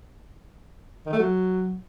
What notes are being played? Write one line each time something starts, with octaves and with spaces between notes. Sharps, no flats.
D#3
A3
F#3